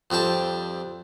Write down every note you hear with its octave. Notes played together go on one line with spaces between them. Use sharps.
F2 G3 C4 G5 A5